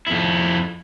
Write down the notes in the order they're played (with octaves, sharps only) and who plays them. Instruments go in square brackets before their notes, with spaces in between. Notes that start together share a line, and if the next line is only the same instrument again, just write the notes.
[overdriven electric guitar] F2 E4